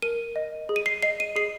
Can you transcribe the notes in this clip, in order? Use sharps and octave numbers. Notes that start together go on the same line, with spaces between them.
A#4 D#7
D#5
G#4
D#7
C7
D#5 C7
D#7
G#4 C7